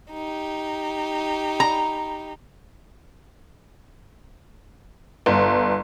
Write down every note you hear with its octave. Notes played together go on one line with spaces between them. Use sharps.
D#4 G4
A#5
G1